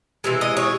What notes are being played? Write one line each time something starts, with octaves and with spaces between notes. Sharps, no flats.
C3 E3 G#3
D#5
C#5